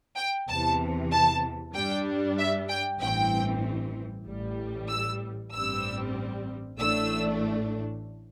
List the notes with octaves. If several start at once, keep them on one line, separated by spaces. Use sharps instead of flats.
G5
E2 C3 E3 A5
A5
G2 G3 D4 G5
E5
G5
A1 G2 E3 C4 G5
A1 A2 G3
E6
A1 G2 G3 C4 E6
A1 A2 A3 D4 E6